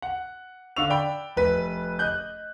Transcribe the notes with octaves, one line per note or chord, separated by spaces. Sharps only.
F#5
D3 F5 C#6 E6 F7
D5 G5 B5
F1 B4 B6
D#5 F#6 G6